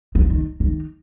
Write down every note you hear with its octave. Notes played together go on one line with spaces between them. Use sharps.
F3
D#3
D#3